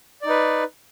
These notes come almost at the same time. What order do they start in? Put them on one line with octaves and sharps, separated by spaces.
D5 D#4 B4